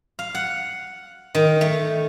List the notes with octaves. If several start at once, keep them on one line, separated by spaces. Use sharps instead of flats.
F5
F#5
D#3
A3